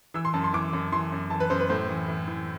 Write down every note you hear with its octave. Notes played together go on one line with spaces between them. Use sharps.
E3 E6
C6
F#2 A5
C6
E3 D6
F#2
E3 C6
F#2
E3 A5
B4
F#2 C5
B4
A2 C5
E3
E3
E3